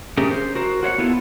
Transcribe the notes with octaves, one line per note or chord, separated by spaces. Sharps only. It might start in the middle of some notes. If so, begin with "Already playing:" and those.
A3 C#4 G4 G#4 A#4
C5
F#4 A#4 C5
F#4 C#5 F5 F#5
B3 E4 F4 A4